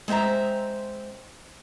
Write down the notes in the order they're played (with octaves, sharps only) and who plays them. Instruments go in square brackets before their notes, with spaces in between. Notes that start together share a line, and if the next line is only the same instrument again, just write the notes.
[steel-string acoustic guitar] G#3 C4 C5 E5 A#5